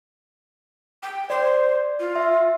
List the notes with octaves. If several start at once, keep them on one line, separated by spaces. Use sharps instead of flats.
G5
C5 D5
F4
E5